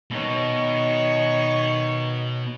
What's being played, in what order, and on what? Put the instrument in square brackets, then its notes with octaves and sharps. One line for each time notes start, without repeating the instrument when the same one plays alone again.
[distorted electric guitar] B2 [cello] D#3 C#5